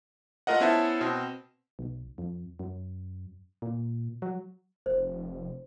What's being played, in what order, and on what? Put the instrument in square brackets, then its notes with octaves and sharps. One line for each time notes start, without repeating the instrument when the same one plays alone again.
[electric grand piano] A3 F4 A#4 D#5 F#5
B3 C#4 E4 C5 E5 A5
B2 C4
[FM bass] B1
F2
F#2
A#2
F#3
[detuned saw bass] F1 [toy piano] C5